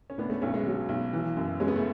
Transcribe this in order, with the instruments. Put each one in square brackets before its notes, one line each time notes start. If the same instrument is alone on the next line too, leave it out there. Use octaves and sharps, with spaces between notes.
[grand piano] C#4
[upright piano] A2 [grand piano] B3 D4
[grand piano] A3 C#4
[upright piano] B1 [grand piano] A3 C#4
[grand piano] G#3 B3
[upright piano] F#3
B1
E3
F#2
[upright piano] G#3 [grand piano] C#4
[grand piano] B3
A3